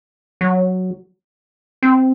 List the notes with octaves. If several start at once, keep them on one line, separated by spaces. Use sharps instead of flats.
F#3
C4